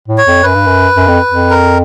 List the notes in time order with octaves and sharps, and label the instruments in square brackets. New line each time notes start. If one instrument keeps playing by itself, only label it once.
[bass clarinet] A2
[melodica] C#5
[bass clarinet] F2
[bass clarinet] F#2 [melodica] B4
[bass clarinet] G2
F#2
F#2
F2
F2
[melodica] A#4